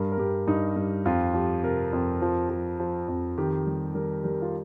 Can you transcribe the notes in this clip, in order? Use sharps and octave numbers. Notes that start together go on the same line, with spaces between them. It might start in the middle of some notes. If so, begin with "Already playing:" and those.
Already playing: G2 A#4
A#4
G2 G4
G2 D#4
G2
F2 F4
F3 G4
C3 A#4
F2
F3
F3
F3
F2
D#3 G4
G3
G3 A#4
G3 A#4
F4